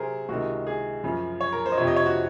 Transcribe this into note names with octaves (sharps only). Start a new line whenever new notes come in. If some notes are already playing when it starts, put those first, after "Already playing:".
Already playing: C3 F#3 G#4 A#4 C5
C#2 C3 D#3 G#3 F#4
G#4
F#2 C#3 F3
C#5
A#4
C5
D#5
F2 C3 F3 C#5
D#5
C#5
F#4